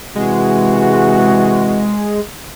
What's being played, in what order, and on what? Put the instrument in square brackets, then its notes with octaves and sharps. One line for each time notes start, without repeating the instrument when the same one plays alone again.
[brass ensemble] C3 E3 F#4 [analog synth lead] G#3